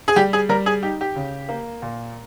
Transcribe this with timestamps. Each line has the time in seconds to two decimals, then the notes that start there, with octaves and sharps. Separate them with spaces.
0.08 G#4
0.16 G3 G4
0.33 G#4
0.49 G3 A#4
0.66 G#4
0.83 D#4 G4
1.01 G4
1.16 C#3
1.49 A#3
1.82 A#2